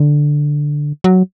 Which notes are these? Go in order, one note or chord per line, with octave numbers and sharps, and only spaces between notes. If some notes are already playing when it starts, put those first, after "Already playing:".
Already playing: D3
F#3